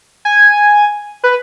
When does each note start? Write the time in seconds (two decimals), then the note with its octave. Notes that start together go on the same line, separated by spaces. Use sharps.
0.25 G#5
1.24 B4